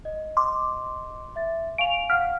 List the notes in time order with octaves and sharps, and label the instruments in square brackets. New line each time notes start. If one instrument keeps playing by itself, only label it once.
[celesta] D#5
[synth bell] C6 D6
[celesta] E5 A6
[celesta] F5 G#5 C#6 [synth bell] D7 F7
[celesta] F5 F#5 B6 [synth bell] F6